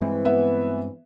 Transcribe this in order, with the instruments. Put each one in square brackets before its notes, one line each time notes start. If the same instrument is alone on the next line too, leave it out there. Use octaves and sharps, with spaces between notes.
[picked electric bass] G2 G#3 C4 [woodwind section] E3
[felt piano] B3 E5